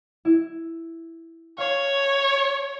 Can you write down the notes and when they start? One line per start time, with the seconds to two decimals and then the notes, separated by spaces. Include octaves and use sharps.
0.25 E4
1.58 C#5 F5 C7